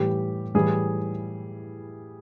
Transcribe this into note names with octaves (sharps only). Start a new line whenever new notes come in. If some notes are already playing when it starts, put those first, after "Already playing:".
Already playing: A2 E3 G3 G4
A2 E3 G3 G#4